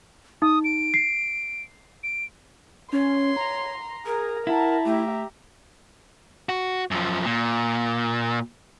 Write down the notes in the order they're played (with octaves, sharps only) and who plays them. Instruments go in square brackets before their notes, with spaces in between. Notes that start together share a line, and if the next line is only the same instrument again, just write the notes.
[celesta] D#4 [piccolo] D#6
[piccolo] D7
[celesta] C7
[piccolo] D7
[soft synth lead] C#4 [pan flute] C#5 [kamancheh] C6
[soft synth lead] A#5
[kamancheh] G#4 [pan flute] A#4
[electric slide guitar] E4 [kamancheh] F#5 A5
[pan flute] A3 [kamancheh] G4 E5
[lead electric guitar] F#4
F#2 F3
A#2